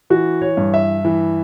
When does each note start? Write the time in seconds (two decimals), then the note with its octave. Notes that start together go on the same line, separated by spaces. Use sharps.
0.10 E3 F#4
0.42 C#5
0.57 G2
0.74 E5
1.05 E3